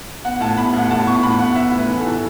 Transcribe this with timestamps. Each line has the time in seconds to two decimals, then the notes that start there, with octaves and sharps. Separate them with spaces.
0.25 B3 F#5
0.41 A2 A5
0.57 B3 B5
0.73 A2
0.78 F#5
0.91 A2 A5
1.06 B3 C#6
1.23 A2 B5
1.39 B3 F#5
1.55 B3 E5
1.72 A2
1.78 B4
1.89 E3
2.00 A4
2.05 E3